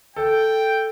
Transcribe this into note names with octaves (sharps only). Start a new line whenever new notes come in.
A4 G5